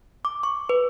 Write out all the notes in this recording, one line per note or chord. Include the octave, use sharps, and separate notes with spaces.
D6
C#6
B4